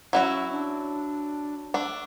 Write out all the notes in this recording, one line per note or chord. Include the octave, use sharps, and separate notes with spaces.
F#3 C#4 E4 F#4
D4
A3 D4